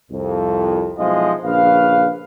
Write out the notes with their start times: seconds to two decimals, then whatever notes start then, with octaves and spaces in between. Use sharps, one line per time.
0.11 C2 F2
0.98 B1 F3 G#3 E4 D#5 F5
1.44 A#1 C#3 B4 F5